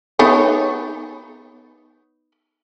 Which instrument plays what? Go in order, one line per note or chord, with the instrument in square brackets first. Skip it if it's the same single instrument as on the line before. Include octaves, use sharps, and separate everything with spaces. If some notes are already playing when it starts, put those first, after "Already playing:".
[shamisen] B3 D#4 C#5